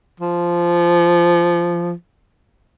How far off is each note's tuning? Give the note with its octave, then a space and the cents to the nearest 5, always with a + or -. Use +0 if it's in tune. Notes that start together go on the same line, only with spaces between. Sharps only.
F3 -15